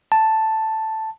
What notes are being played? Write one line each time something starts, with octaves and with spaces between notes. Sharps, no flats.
A5